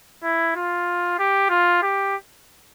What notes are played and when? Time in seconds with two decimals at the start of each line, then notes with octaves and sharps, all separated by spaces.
0.23 E4
0.56 F4
1.19 G4
1.50 F4
1.83 G4